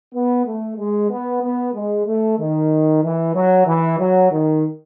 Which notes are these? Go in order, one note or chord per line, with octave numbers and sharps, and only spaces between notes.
B3
A3
G#3
B3
B3
G#3
A3
D#3
E3
F#3
E3
F#3
D#3